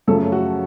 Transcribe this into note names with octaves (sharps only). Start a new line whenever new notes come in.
F#2 C#3 F3 A3 A4
F#4